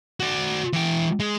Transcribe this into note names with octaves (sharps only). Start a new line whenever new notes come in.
F#4 D5
E3 G5
G#3